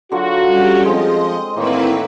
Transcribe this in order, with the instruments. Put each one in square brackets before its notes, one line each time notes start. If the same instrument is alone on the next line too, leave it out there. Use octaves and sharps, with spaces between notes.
[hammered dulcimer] D3 F#3 F4 [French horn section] F#4
[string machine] G3 C#4 G4
[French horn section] F3 [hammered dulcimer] G#3 C4 [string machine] D#5
[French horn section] E2 D#3 [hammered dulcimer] A2 A#3 C#6 [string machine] C4 E4 B4